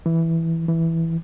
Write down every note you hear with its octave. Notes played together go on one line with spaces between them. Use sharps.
E3
E3